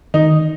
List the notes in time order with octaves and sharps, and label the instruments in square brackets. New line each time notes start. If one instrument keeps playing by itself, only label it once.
[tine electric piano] D#3 [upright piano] D#4